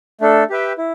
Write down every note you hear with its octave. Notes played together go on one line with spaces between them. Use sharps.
A3 D4 A4
G4 B4 E5 G5
E4